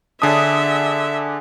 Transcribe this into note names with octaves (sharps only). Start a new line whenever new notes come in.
D3 D4 G#4 E5 D#6